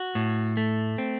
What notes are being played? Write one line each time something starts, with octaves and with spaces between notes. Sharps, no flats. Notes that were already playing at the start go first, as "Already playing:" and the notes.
Already playing: F#4
A2
A3
C4